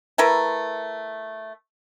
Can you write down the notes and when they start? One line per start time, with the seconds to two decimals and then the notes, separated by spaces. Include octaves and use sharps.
0.18 A3 E4 A#4 B4